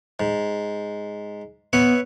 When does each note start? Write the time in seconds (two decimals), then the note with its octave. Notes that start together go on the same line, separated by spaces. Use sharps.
0.20 G#2
1.73 B3 B4 C#5 E5